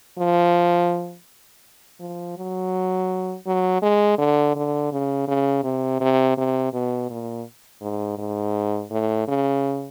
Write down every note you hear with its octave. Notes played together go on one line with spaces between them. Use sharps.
F3
F3
F#3
F#3
G#3
D3
D3
C#3
C#3
C3
C3
C3
B2
A#2
G#2
G#2
A2
C#3